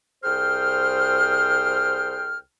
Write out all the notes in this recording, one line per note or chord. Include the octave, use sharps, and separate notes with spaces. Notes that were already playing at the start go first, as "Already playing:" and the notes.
C2 G#4 C5 G5 F6